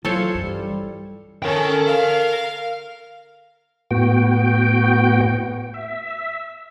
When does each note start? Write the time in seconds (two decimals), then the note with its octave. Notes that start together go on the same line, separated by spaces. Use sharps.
0.05 E3 F#3 F4 A4 C5 C#5
0.35 G2 G3 C#4
1.42 C#4 A4 A#4 G5
1.86 F5
3.91 A2 B3 F#4 G5
5.74 E5